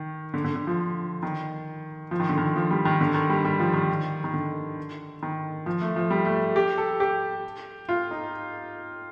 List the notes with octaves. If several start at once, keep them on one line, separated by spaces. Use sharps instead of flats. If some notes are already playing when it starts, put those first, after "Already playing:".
Already playing: D#3
D3
D3
D3
F3
D#3
F3
D#3
D3
D#3
F3
G3
D#3
D3
D#3
G3
G3
F3
D#3
D#3
D3
D#3
F3
A3
F3
G3
A3
G4
A4
G4
F4
D#4